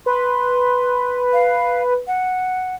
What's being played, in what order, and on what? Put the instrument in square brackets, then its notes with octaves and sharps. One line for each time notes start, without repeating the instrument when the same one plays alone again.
[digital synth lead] B4 [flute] C6
[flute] F5
F#5